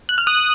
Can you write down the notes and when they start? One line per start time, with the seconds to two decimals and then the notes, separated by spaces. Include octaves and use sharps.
0.09 F#6
0.18 F6
0.27 D#6 F#6